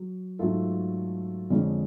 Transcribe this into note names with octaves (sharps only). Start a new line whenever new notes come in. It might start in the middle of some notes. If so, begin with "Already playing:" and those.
Already playing: F#3
G#2 F#3 A3 F4 A4
F2 D3 G#3 C#4